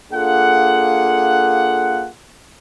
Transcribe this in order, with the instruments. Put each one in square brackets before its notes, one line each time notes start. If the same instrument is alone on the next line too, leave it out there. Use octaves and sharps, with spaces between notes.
[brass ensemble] A#3 D4 F4 G#4 A4 F#5